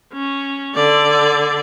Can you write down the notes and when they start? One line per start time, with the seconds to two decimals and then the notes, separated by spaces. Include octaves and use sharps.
0.13 C#4
0.75 D3 D5